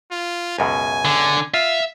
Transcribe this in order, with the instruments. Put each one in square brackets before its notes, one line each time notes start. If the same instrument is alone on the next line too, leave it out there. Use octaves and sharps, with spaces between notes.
[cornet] F4
[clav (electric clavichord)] C#2 F#2 B2 [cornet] G#5
[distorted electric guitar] D3
[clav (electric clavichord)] F4 [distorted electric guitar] E5 [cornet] F5